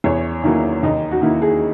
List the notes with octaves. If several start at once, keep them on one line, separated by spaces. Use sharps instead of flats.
E2 C#5
D#3 F#3 A#3 E4
D#2 D#4
F#4
D#3 A#3 E4
G#4